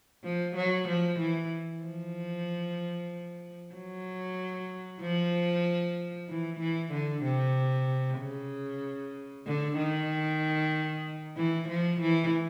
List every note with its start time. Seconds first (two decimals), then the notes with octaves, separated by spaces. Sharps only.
0.24 F3
0.56 F#3
0.88 F3
1.19 E3
1.83 F3
3.75 F#3
5.01 F3
6.28 E3
6.60 E3
6.92 D3
7.24 C3
8.19 C#3
9.47 D3
9.77 D#3
11.36 E3
11.69 F3
12.01 E3